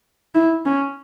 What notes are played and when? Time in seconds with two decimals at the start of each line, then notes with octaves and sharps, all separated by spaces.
0.35 E4
0.66 C#4